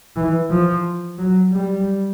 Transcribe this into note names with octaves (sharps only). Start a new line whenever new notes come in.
E3
F3
F#3
G3